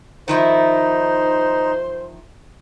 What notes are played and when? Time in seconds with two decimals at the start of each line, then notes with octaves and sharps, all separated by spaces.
0.28 D#3 F3 D#4 E4 C5